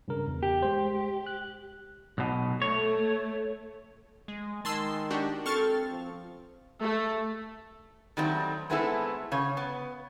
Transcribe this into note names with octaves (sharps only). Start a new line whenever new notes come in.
G2 C#3 A#4
E2
G4
G#3 C5
F#6
B1 B2
A3 C#5
G#3
D#3 G#3 A5 C6 E6
D4 F#4 G4
C4 A4 C#6 F6 A6
F3
A3
D#3 F#3 G3 A3 C4
G#3 A3 B3 C4 E4 A4
C#3 C#5
B3